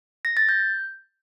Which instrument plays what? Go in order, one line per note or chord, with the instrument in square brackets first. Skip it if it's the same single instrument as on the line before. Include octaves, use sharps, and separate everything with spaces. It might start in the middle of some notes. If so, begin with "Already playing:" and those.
[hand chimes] A#6
A6
G6